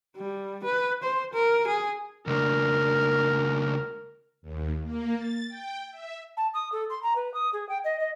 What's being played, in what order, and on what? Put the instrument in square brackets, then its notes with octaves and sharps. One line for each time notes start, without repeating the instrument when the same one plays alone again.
[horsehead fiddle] G3
B4
C5
A#4
G#4
[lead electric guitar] C#2 D4 [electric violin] A#4
[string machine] D#2
A#3
A6
G5
E5
[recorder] A5
D#6
A4
C6
A#5
B4
D#6
G#4
G5
D#5
D#5